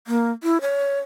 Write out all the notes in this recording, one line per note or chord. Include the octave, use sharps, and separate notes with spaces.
A#3
E4
C#5